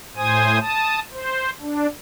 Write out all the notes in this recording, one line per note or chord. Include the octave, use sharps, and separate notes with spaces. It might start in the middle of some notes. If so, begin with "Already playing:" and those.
A2 C5 G#5 D#6
A5 D#6
C5
D4